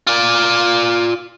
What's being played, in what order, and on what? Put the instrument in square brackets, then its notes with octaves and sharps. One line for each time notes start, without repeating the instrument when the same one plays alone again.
[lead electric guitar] F4 D5